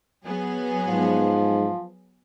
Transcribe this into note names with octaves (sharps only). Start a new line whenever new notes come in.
F#3 B3 G#4
G#2 F3